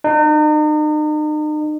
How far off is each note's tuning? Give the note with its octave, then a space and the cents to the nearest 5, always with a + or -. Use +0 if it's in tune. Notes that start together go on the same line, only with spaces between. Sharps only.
D#4 -40